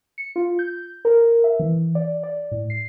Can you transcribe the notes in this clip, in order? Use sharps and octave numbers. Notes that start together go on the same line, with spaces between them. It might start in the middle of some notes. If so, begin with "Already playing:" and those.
C#7
F4
G6
A#4
E5
E3
D5
D5
A2
C7